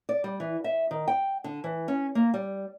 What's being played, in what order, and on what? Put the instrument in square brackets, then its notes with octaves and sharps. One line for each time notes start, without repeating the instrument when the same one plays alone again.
[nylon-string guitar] D5
G3
E3
E5
D#3
G5
D3
E3
C#4
A#3
G3